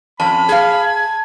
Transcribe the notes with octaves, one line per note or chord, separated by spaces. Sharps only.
F2 C#4 A5 B5
G#4 F5 G#6